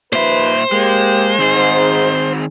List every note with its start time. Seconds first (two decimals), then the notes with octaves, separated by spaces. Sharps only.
0.13 D#2 A#2 F3 B4 C5 E5
0.72 G#3 A#3 G4
1.39 G#2 D#3 C4 G#4